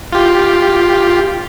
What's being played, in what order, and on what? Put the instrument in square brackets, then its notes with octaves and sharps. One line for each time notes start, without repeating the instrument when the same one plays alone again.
[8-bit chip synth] F4 G4